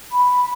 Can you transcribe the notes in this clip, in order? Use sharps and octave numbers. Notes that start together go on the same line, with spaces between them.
B5